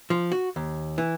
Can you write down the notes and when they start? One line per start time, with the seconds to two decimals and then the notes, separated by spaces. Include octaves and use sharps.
0.10 F3
0.32 F#4
0.56 D#2
0.98 E3